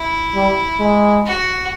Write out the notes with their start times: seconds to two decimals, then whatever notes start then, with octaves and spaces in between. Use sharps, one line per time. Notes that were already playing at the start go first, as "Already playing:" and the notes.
Already playing: E4
0.35 G3
0.79 G#3
1.25 F#4